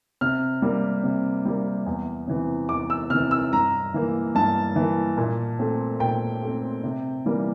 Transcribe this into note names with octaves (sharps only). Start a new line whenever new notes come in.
C3 F6
G3 A#3
C3
G3 A#3
E2
C3 E3
E2 D6
E6
C3 E3 F6
E6
G2 A#5
E3 A#3
G2 A5
E3 A#3
A#2
A3 C4
A#2 G5
A3 C4
C3
E3 G3 A#3